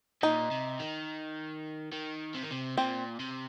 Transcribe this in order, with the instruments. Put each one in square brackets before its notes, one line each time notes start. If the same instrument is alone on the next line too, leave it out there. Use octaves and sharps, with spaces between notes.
[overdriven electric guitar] A#2 [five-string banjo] D#4
[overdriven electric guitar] C3
D#3
D#3
C3
D#3
C3
[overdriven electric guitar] A#2 [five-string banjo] C4
[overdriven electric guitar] C3